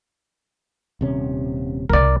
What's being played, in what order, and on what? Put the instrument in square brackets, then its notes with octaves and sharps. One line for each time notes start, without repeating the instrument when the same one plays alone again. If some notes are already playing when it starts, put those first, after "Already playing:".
[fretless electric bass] D#1 C3 C#4
[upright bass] C2 C#3 [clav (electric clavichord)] A#4 D5